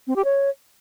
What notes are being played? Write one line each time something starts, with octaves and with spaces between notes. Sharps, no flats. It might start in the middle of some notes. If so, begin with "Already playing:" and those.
C4
G4
C#5